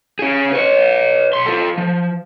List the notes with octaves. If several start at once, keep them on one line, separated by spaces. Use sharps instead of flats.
C#4 G#4
B4 C#5
B1 C6
F4 A4
F3